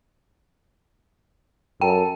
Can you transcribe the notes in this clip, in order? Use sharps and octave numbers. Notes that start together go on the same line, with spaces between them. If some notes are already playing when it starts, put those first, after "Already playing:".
F#2 A4 G5